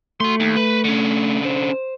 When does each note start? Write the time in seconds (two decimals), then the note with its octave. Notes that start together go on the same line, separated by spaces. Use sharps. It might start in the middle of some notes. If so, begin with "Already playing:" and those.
0.20 A3 F#4 C6
0.40 D#2
0.57 B4
0.84 D3 C#4
1.45 C5